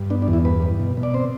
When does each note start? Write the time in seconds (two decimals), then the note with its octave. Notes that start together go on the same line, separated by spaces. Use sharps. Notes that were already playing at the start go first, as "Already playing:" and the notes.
Already playing: G2
0.10 B3 D4
0.22 D4
0.28 E2
0.33 E4
0.45 G2 B4
0.62 G2
0.80 B2
0.97 B2
1.03 D5
1.14 C4 C5